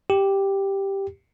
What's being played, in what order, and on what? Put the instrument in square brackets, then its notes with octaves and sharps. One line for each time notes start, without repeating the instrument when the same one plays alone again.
[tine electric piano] G4